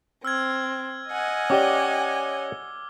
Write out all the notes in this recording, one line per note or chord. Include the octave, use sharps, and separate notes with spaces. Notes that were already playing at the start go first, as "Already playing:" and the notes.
C4 E6 F6 G#6
D#5 F#5 G#5
C#4 G4 D5 D6 G7